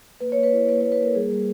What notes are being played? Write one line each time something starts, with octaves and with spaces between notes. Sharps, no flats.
A#3 B4
A#3 C#5
B4
E4
A#3 B4
A#3 C#5
B4
A#3 A#4
G3 G#4
G3